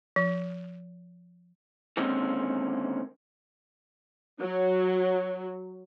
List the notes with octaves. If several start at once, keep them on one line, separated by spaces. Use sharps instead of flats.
F3
D3 D#3 G#3 A#3 C4 C#4
F#3